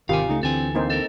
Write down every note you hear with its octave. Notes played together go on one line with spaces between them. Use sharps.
G#1 C3 D#3 F4 G4 F5 G#5
C#2 C#3 A3 D#4
D2 D3 E3 C4 A4 G#5
A#3 C4 D#4 C5
A4 A#4